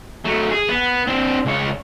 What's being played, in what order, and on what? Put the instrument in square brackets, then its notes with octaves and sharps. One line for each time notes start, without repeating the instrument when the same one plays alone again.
[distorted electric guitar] F#3 A3
G#4
B3
C4 D4
C#2 C#5